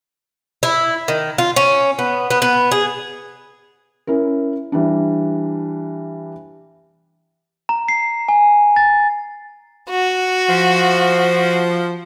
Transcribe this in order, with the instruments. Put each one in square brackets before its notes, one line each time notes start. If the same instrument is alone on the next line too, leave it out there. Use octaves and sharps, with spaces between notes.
[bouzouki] E4
D#3
F4
C#4
B3
B3
B3
G#4
[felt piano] C#4 E4 A#4
E3 G3 D4
[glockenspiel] A#5
C7
G#5
A6
[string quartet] F#4
[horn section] F3